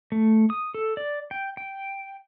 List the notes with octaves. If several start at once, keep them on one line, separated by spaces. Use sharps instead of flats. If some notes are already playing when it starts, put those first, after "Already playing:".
A3
D#6
A4
D5
G5
G5